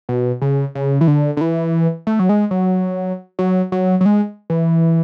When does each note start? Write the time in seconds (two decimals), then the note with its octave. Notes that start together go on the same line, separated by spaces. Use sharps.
0.09 B2
0.42 C#3
0.75 C#3
1.01 E3
1.08 D3
1.37 D3
1.41 E3
2.07 A3
2.19 F#3
2.29 G#3
2.51 F#3
3.39 F#3
3.72 F#3
4.01 F#3
4.06 G#3
4.50 E3